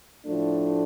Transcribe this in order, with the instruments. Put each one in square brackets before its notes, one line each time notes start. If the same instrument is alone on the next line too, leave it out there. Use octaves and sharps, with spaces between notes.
[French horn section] A2 F3 A3 D4